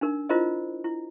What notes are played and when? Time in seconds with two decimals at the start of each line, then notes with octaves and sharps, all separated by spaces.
0.01 D4 D#4 A#4
0.29 E4 F4 A#4 C5 D#5
0.84 E4